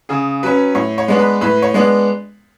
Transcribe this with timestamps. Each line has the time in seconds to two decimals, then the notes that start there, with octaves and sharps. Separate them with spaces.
0.09 C#3 G#4
0.43 F#3 C#4 B4
0.75 A2 C#5
0.98 C#5
1.08 G#3 B3 D4
1.19 B4
1.41 A2 B4
1.62 C#5
1.74 G#3 B3 D4